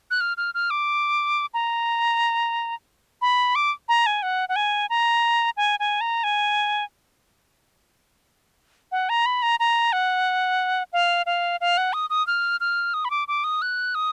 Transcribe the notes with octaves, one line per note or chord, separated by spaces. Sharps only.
F#6
F6
F6
F6
D6
A#5
B5
D6
A#5
G#5
F#5
F#5
G#5
A#5
G#5
G#5
A#5
G#5
F#5
A#5
B5
A#5
A#5
F#5
F5
F5
F5
F#5
D#6
D#6
F6
F6
D#6
B5
D6
D6
D#6
F#6
D#6